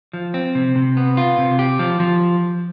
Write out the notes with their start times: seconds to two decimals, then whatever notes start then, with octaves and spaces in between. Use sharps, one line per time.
0.13 F3
0.34 C4
0.55 C3
0.76 C3
0.97 B3
1.17 F4
1.38 C3
1.59 G4
1.79 F3
2.00 F3